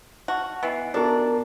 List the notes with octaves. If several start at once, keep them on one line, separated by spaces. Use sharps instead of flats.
F#4 A5 F6
E3 B3 D#5 C7 D7
B3 D4 F4 F#4 A#4 A5